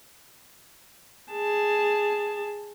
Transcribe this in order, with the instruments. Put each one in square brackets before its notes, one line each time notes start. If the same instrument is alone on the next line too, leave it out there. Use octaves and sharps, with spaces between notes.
[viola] G#4 A5